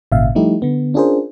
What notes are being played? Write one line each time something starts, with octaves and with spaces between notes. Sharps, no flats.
G#1 A#2 C#3 E5 F5
F3 G3 A3 D#4 E4 G4
D3 B3
C#4 D4 F4 G#4 A#4 C5